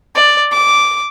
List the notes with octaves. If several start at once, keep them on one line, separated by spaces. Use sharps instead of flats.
D5
D6